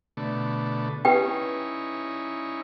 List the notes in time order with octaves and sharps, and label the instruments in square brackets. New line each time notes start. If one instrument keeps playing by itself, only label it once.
[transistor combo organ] B2 D3 A3
[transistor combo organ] C#4 D#4 E4 [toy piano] G4 B4 G5